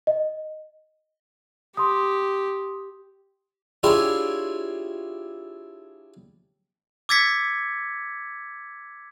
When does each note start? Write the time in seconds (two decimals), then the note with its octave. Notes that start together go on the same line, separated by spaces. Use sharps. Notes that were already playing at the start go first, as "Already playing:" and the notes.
0.07 D#5
1.77 G4 C6 D#6
3.83 D4 E4 F4 G4 G#4 C#5
7.09 D6 E6 G#6 A6 B6 C#7